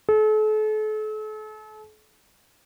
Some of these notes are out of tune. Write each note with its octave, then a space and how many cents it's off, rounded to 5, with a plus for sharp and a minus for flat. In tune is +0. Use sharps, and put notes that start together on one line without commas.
A4 -40